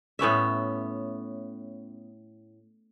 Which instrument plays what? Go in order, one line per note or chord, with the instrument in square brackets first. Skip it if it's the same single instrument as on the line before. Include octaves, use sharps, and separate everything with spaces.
[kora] A2 B3 C#4 E5